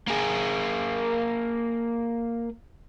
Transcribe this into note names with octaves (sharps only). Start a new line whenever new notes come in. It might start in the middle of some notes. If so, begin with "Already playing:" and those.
A#3 G#4